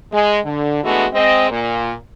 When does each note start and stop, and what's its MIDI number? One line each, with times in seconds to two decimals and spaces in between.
0.13 0.38 56
0.45 0.80 50
0.84 1.05 52
0.84 1.05 56
0.84 1.05 57
0.84 1.05 59
0.84 1.05 62
0.84 1.05 66
1.13 1.50 56
1.13 1.50 60
1.13 1.50 75
1.51 1.94 46